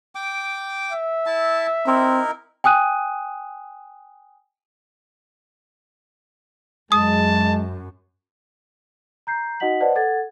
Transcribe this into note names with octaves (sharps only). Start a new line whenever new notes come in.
G5 D6
E5
E4 A5
C4 D#4 E4 A#4
G5 G#5 D#6 F#6 D#7
F#2 G#3 A5 D#6
A#5 G6 C7
D#4 F#4 D#5 F#5 B6 F#7
B4 C5 D5 D#5 F#5 A5
A4 F#5 G#6 A6